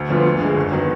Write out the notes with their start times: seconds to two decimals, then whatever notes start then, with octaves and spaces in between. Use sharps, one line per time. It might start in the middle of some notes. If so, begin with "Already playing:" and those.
Already playing: D2
0.09 D3 F3 B3 F4
0.25 D2
0.40 D3 G#3
0.57 F#1
0.72 D#3 F#3 B3